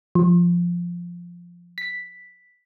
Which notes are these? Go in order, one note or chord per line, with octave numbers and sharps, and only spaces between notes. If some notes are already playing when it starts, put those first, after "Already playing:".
F3
B6